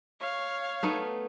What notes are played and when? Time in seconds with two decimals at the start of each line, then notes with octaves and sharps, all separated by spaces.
0.20 C#5 F5
0.83 A3 B3 D#4